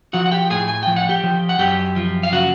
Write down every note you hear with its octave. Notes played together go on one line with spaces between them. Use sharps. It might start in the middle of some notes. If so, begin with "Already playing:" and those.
F3 F#4 F#5
F#5
G4 G5
A2 G#4 G#5
G#5
F3 G5
F#5
G4 G5
F3
F#5
F#2 G4 G5
F3
F5
C#3 F#4 F#5